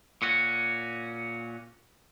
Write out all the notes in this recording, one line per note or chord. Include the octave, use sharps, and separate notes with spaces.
A#2 C#4 F#4